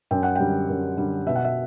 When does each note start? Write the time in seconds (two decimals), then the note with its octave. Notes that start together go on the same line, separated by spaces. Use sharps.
0.11 F#2 G5
0.23 F#5
0.36 D3 G3 G5
0.69 F#2
0.97 D3 G3
1.26 B2 E5
1.36 F#5
1.44 E5